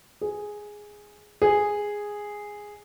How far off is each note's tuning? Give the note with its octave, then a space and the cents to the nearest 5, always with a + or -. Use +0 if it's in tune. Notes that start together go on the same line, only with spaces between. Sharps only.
G#4 +0
G#4 -5